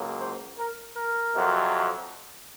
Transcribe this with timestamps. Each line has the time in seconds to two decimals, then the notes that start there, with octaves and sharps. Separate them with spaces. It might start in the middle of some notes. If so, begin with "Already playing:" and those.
Already playing: C#2 C#3 F#3 A#3
0.19 C5
0.57 A#4
0.95 A#4
1.33 F2 C3 F#3